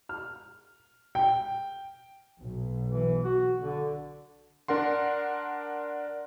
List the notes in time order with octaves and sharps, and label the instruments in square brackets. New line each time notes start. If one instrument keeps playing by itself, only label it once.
[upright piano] F6
G5
[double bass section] B1
[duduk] E3
F#4
D3
[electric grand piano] D4 A#4 F#5 C6